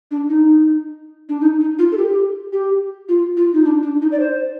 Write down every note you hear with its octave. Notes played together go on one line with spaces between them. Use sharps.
D4
D#4
D4
D#4
D#4
F4
A4
G4
G4
F4
F4
D#4
D4
D4
D#4
D5
C5